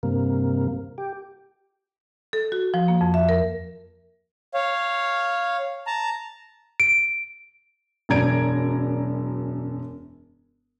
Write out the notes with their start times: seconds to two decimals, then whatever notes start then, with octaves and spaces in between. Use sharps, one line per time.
0.03 G2 C3 A#3
0.98 G4
2.33 A4
2.52 F#4
2.74 F3
2.88 A#3
3.01 F2
3.14 E5
3.29 A#4
4.53 C#5 F5
5.87 A5 A#5
6.80 D7
8.09 E1 F#2 D5 A#5 G#6 D7